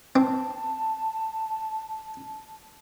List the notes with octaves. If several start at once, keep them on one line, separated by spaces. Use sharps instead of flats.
C4 A5